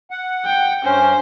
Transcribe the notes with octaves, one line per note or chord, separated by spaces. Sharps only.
F#5
G5
G2 C#4 C5